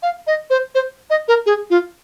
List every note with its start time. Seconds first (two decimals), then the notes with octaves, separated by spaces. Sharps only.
0.03 F5
0.27 D#5
0.50 C5
0.75 C5
1.10 D#5
1.28 A#4
1.46 G#4
1.70 F4